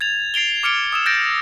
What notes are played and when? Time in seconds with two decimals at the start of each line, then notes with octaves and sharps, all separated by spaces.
0.01 G#6 A6 F7
0.34 A6 C7 D7 F7 G7
0.63 D6 F6 C#7 D7 G7
0.93 D#6 E6 E7
1.06 G6 A6 A#6 D7